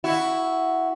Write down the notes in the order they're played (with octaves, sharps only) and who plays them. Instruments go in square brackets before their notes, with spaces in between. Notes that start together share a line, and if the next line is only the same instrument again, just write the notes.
[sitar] E4 F#4